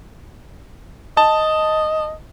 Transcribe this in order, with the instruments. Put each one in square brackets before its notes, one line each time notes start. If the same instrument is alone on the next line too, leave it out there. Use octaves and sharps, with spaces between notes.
[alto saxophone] D#5 [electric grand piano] A5